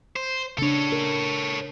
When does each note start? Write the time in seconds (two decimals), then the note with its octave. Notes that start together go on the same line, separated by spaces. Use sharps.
0.16 C5
0.58 C#3 D4 A4 C#5
0.92 A#4